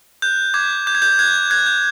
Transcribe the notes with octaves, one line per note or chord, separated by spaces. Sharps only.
F#6 G6
D6 G#6
D6 G6
G#6
G6
F#6 G#6
F#6 G#6
G6